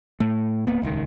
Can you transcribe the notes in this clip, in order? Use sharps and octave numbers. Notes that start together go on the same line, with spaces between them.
A2 A3
D1 A#3 B3
D#1 C#2 A#2 D#3